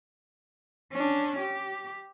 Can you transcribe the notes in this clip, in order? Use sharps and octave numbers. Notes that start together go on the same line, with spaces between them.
C#4 D4
G4